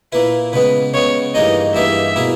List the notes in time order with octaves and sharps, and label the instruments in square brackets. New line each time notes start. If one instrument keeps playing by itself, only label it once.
[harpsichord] A#2 A#3 E4 [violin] B4
[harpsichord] C#3 G#3 B3 [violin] B4
[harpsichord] C#3 G#3 B3 [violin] C#5
[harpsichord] G2 E3 A#3 D#4 G#4 [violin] D#5
[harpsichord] G2 E3 A#3 D#4 G#4 [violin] E5
[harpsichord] B2 A#3 E4 G#4